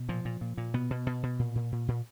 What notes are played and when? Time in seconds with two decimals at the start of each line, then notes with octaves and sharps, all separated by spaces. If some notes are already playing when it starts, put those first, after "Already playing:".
Already playing: B2
0.09 A#2 F3
0.25 A#2
0.41 A#2
0.57 A#2
0.74 B2 B3
0.90 B2
1.06 B2
1.23 B2
1.39 A#2
1.55 A#2
1.72 A#2
1.88 A#2